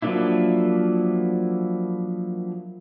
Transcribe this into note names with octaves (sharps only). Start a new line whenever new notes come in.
F3 F#3 A#3 D4 E4